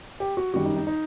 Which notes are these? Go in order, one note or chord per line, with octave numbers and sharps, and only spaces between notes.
G4
F#4
F#2 D#3 G3 F#4
D#4
D#4
D#4